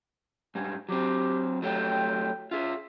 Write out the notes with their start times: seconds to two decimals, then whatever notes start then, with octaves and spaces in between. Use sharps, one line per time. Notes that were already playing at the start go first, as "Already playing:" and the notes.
0.55 G#2 G3 G#5
0.89 F#3 C4 G4
1.62 F#3 A3 G4 G5
2.51 F4 G#4 E5